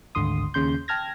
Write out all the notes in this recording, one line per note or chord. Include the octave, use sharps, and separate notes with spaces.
G#1 D2 D3 C6 D#6
D#2 C#3 C6 G6
G5 A5 F6 G#6 A#6